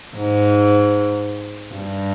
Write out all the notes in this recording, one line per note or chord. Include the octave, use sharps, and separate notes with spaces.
G#2
G2